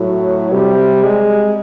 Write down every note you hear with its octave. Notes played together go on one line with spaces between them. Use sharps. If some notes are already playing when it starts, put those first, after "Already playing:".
Already playing: A2 F#3
C3 G3
G#3